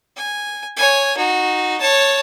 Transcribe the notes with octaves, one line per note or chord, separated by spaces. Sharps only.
G#5
C#5 G#5
D#4 F#4
C#5 A5